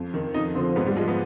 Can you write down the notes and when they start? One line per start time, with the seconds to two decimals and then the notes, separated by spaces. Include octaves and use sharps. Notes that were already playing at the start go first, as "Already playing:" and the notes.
Already playing: F2
0.14 D#3
0.34 F2 D#4
0.55 D3 F3 C4
0.76 G#2 B3
0.86 G3
0.96 F3 G#3
1.08 B3